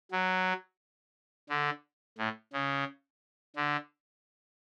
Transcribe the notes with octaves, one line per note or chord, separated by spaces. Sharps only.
F#3
D3
A2
C#3
D3